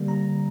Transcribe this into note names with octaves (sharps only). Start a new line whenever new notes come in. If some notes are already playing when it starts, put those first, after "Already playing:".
Already playing: D3 G3 A#3
A#5